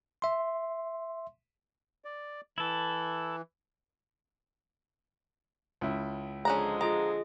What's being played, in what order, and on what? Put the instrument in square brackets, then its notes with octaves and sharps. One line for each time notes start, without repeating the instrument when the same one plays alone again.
[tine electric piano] E5 C6
[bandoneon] D5
[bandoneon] E3 [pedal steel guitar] E4 A4
[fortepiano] C#2 E4
[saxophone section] D3 F3 G#3 [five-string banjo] C#4 D4 A#5
[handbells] F4 G#4 D#5 [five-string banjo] A#5